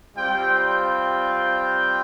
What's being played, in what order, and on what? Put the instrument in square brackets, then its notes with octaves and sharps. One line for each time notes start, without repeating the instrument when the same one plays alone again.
[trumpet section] G3 C4 F4 G5
G5